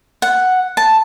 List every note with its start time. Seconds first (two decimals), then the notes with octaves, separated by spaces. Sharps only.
0.22 F#5
0.77 A5